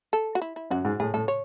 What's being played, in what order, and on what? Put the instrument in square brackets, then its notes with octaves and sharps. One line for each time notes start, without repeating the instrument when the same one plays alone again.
[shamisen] A4
F#4
E4
E4
[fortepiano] F#2 [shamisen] F#4
[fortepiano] G#2
[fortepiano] A2 [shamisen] G#4
[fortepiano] A2 [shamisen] A4
[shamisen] C#5